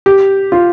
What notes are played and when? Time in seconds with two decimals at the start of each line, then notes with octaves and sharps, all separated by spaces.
0.06 G4
0.52 F4